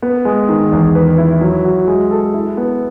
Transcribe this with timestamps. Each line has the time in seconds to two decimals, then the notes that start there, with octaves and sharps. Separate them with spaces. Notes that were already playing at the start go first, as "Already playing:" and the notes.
0.02 B3
0.25 G#3
0.49 D#3
0.72 E2
0.95 B4
1.18 E4
1.41 F#3
1.65 F#4
1.88 G#3
2.11 A4
2.34 E4
2.57 B3